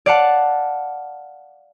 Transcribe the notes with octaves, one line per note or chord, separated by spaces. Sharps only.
D5 F5 F#5 A5